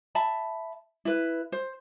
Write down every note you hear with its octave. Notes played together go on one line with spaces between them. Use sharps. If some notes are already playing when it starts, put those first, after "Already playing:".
E5 A5 B5
E4 B4
C5